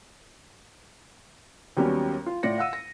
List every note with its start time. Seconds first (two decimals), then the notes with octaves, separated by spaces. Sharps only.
1.77 D#2 F#3 G3 B3 C#4
2.26 F4
2.43 A2 F4 D5 A#6 C#7
2.58 F5 F#5 E6 D#7
2.73 A#6